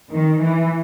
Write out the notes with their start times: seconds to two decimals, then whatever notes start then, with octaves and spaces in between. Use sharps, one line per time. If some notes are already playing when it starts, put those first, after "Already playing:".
0.12 D#3
0.41 E3